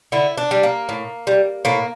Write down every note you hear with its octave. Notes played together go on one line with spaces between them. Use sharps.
D3 E4
D4
G3
A#3
A2
G3
A2 A#3